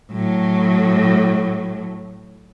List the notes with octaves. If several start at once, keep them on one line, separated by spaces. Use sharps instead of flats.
A2 F#3